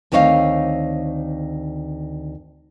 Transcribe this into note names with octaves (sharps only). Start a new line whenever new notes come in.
D2 D#3 C4 C#5 D#5 F5